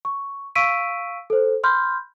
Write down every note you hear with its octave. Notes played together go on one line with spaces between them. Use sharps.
C#6
F5 C#6 E6 B6 D7 D#7
A4 C5
B5 C6 F6 G6